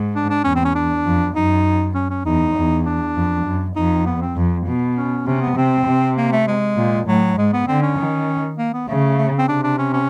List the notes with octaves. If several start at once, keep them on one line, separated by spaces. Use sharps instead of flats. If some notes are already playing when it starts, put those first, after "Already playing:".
Already playing: G#2
D4
D4
E2 C#4
C4
C#4
D4
F2
F#2 D#4
C#4
C#4
E2 D#4
E2
D4
F2
F#2
F2 D#4
B3
C4
F2
B2
C#4
C3 C#4
B3
C3 C4
C3
A#3
A3
G#3
A#2
A2 F#3
G#2 G#3
B3
D3 C4
C#4
D#3
A#3
B3
C#3 A3
A3
C4
C3 D4
D4
C#4
C#4